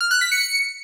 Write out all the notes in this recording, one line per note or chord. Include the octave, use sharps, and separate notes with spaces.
F6
F#6
B6
C#7